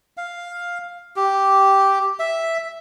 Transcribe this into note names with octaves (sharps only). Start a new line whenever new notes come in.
F5
G4
E5